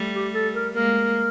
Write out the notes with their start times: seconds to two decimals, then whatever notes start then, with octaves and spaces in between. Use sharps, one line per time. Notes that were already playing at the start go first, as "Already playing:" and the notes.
Already playing: G3 A3
0.15 G4
0.34 A4
0.55 A#4
0.74 G#3 A#3 A#4